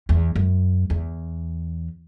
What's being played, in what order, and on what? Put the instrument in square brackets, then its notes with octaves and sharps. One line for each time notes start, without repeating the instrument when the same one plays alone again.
[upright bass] E2
F#2
E2